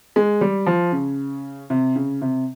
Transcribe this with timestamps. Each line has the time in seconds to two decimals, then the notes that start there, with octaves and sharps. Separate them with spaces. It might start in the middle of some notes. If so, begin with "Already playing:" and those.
0.16 G#3
0.41 G3
0.66 F3
0.92 C#3
1.70 C3
1.96 C#3
2.22 C3